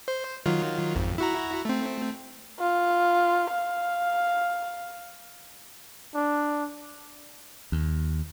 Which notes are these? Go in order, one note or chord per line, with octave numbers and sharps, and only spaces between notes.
C5
D#3 F#3 F4
G#1 F2
E4 F#4 A#5
A3 C4
F4
F5
D4
D#2